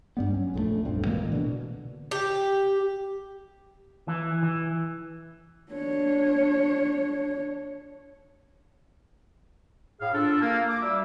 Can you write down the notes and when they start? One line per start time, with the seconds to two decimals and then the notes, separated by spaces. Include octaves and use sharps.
0.17 G2 G3 B3
0.30 F#3 C#4
0.54 A#1 F2 G3 A3
0.84 D1 B1 G2 C4
1.06 A2 E3 G#3 A#3
1.32 B2 D3
2.11 G4
4.08 E3
4.43 E3
5.72 D4 C#5
10.01 A2 G#4 F5
10.14 D4 F4 A4
10.42 A#3
10.69 D6
10.82 G3 F#4 E5